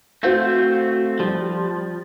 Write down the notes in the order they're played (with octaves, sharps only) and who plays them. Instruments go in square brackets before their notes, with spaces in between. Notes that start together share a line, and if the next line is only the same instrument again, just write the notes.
[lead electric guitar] A3 C4 [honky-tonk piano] F#4 C5 F5
[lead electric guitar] F3 [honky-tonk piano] G3